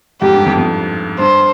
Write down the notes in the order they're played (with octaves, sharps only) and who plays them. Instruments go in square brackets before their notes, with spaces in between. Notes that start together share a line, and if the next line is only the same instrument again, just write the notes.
[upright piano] F2 G#2 [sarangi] G4
[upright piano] G2
F2
F2
[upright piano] G2 [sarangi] C5